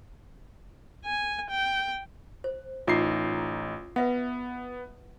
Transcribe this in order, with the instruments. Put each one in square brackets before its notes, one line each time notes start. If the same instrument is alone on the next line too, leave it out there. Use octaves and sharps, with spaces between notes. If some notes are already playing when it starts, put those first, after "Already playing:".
[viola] G#5
G5
[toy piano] C5
[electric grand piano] A1 D#4 C7 [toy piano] F4 E5 D6
[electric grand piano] B3 [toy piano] B4 E5 F#5